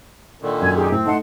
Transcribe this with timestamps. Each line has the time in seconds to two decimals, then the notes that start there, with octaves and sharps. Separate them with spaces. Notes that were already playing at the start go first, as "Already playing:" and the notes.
0.42 A#2 D3 D#3
0.61 F#2 G#5 G#6
0.75 D#4 G4 G#4
0.91 A2 C4
1.06 A3 D#4 F#5 A5 C6